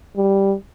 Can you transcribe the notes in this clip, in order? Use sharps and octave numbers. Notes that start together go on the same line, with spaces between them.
G3